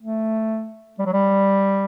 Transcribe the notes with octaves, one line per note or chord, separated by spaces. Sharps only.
A3
G3
F#3
G3